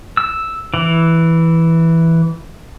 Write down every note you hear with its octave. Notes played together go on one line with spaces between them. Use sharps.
E6
E3